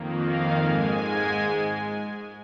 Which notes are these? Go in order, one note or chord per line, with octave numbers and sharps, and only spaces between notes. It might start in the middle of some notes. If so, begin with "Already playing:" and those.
Already playing: F2 D#3 A#3
F5
G#2 G#3 G#5